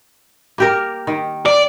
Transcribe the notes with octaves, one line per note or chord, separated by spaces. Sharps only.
A#3 G4 A#4
D#3
D5